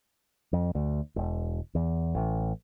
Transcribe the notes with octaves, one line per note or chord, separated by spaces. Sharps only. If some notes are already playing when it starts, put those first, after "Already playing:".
F2
D2
E1
E2
A1